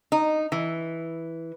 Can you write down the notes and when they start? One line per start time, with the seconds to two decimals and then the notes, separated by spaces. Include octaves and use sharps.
0.12 D#4
0.52 E3